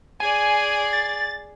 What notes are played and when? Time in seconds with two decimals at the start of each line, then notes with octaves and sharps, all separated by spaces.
0.20 G#4 D5 G#5
0.93 A6